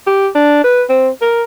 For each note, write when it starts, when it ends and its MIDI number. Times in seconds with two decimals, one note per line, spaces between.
0.07 0.28 67
0.35 0.64 62
0.64 0.83 71
0.89 1.09 60
1.22 1.43 70